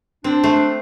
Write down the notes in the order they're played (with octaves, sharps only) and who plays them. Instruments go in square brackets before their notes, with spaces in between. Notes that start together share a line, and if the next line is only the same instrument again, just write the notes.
[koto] C4 [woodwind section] D4
[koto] A3 C5